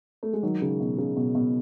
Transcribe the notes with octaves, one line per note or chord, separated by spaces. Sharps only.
A3
G#3
D#3 F#3
C#3
B2
C#3
B2
B2